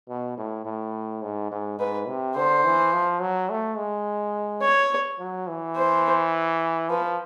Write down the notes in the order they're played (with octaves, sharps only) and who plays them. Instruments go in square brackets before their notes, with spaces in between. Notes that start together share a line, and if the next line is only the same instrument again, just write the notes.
[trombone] B2
A2
A2
G#2
G#2
[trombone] G#2 [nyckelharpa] B4
[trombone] C3
[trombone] D3 [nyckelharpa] C5
[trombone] E3
F3
F#3
A3
G#3
[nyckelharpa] C#5
[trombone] F#3
E3
[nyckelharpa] C5
[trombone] F3 [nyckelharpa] B4